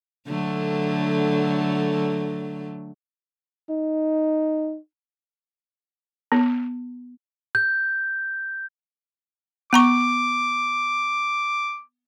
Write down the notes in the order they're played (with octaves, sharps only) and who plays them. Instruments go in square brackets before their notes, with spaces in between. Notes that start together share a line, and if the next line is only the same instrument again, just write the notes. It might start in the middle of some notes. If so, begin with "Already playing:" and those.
[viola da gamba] D3 F#3 A3
[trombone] D#4
[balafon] B3
[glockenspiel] G6
[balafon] B3 A#5 C#6 [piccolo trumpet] D6